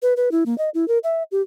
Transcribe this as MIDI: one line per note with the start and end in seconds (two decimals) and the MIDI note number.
0.02 0.14 71
0.17 0.31 71
0.32 0.44 64
0.46 0.57 58
0.58 0.70 75
0.74 0.87 64
0.88 0.98 70
1.04 1.23 76
1.32 1.42 67